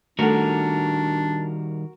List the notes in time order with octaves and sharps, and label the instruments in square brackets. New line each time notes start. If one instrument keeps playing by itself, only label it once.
[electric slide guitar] D#3 G3 [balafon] A3 A4 [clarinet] D4 [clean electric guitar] F#4 A#4